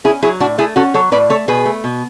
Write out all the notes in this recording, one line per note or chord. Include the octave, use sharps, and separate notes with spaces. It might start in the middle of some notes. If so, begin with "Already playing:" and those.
C#4 E4 G#4
F#3 E4 G#4
A2 D4 F#4
A3 E4 G#4
C#4 F#4 A4
F#3 A4 C#5
A2 B4 D5
A3 A4 C#5
B2 G#4 B4
A3
B2